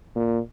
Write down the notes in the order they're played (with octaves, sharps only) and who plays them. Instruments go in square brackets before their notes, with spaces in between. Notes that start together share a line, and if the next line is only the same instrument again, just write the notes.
[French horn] A#2